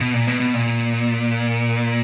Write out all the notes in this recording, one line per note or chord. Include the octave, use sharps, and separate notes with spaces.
B2
A#2
B2
B2
A#2